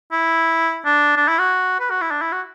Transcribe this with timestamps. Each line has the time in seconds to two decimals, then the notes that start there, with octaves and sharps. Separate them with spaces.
0.12 E4
0.85 D4
1.17 D4
1.28 E4
1.39 F#4
1.80 B4
1.91 F#4
2.01 E4
2.11 D4
2.22 E4
2.32 F#4